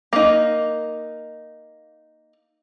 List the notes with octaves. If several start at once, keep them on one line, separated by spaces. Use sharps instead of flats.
A#3 D#4